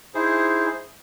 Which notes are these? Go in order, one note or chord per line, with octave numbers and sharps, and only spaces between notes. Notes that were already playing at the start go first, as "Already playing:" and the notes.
D#4 E4 G#4 C5